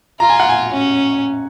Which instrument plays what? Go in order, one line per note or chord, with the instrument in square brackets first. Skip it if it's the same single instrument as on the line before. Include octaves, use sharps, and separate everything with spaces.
[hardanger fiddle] F4 [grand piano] A#5
[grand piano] G#5
F#5
G#5
[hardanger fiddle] C#4